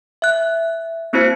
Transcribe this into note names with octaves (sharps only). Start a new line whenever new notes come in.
E5 F#6
A#3 C4 E4 F#4 C5 C#7